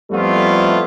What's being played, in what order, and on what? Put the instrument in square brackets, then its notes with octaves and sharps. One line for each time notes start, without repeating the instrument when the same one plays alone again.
[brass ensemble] F2 G3 A3 B3 E4 F4